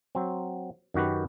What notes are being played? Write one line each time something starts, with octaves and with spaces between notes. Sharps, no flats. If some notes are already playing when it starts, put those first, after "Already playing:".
F#3 C4
F#2 D#3 F#4 G4 B4